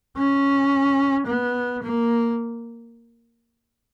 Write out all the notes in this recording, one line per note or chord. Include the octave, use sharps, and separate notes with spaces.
C#4
B3
A#3